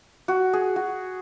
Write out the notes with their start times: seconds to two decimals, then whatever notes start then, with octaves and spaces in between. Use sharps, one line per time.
0.28 F#4
0.53 G#4
0.76 F#4